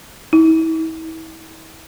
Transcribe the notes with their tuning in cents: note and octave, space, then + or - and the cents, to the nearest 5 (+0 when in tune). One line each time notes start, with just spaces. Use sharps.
E4 -40